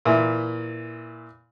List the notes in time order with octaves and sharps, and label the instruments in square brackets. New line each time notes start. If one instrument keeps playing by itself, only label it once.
[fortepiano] A#2 E3